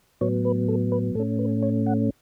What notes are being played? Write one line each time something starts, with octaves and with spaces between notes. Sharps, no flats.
A2 F#3 B3 C#5
B4
A4
B4
A2 A3 C#4 A4
B4
C#5
F#5